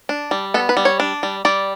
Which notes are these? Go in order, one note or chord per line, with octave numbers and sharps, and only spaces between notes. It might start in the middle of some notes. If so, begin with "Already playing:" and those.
D4
G3
B3 A4
B4
G3
C#5
D4
G3
G3 D5